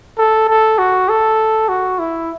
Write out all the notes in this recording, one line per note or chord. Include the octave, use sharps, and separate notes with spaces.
A4
A4
F#4
A4
F#4
E4